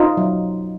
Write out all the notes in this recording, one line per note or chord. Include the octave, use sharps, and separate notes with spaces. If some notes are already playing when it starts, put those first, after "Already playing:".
Already playing: D#4 F4
F#3